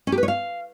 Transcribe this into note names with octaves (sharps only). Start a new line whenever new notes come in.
C#4
G4
B4
C#5
F5